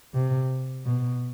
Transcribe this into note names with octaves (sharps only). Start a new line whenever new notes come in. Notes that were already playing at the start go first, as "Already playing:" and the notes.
C3
B2